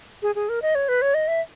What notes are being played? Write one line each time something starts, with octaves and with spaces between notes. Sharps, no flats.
G#4
G#4
A#4
D#5
C#5
B4
C#5
D#5
E5